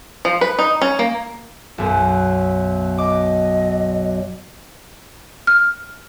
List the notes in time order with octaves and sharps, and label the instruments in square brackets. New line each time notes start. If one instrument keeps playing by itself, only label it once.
[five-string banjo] F3
B4
D#4
C#4
A#3
[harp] B1 F#2
[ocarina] D#5 [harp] D6
[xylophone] F6